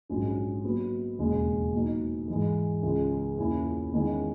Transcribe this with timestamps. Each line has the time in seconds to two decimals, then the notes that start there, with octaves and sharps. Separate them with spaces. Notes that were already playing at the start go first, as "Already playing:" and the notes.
0.09 A#1 G#2 F#3 C#4
0.63 A#2 F#3 B3 F#4
1.18 E1 D#2 C#3 G#3
1.74 A#2 F#3 B3 D#4
2.28 G#2 E3 G#3
2.83 C#2 C#3 G#3
3.38 E2 B2 A#3 C#4 E4
3.93 E2 D#3 G#3 C#4 E4